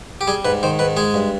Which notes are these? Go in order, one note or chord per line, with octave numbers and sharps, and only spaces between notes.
G4
G3 G#4
G#2 B4
D#3 C5
G#2 B4
G#3 G#4
G2